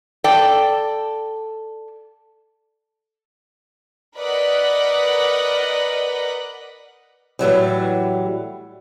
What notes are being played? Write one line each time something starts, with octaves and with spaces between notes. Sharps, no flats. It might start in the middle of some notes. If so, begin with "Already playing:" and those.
A4 D5 G5
A#4 B4 D5 D#5 F#5 B5
A2 E3 F#3 G3